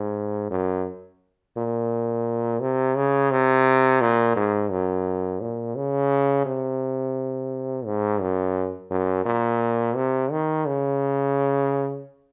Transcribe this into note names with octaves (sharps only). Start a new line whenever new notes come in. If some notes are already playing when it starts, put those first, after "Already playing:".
Already playing: G#2
F#2
A#2
C3
C#3
C3
A#2
G#2
F#2
A#2
C#3
C3
G#2
F#2
F#2
A#2
C3
D#3
C#3